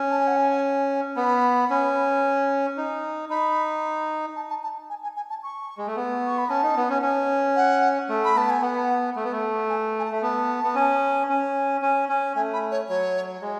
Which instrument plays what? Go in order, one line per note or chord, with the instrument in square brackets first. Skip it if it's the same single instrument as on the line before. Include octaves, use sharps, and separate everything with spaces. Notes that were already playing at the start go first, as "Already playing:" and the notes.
Already playing: [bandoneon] C#4
[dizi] A5
G#5
F#5
G#5
[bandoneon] B3 [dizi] B5
[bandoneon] C#4
D#4
[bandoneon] D#4 [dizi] B5
[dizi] A5
A5
A5
G#5
G#5
G#5
A5
C#6
[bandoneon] G#3
A3
B3
[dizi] C#6
B5
[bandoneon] C#4 [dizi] A5
[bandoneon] D#4
B3
C#4
C#4
[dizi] F#5
[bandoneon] A3
[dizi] B5
[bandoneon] B3 [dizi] A5
[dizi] G#5
[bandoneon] B3 [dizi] F#5
[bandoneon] A3
B3
A3
[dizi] G#5
G#5
A5
[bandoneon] A3
[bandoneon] B3 [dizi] A5
[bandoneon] B3
C#4
C#4
C#4
C#4
[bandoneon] A3 [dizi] G#5
[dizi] B5
C#5
[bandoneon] F#3 [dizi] C#5
[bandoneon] G#3